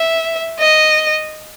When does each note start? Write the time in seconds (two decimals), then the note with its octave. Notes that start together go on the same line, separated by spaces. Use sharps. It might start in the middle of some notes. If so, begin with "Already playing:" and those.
Already playing: E5
0.59 D#5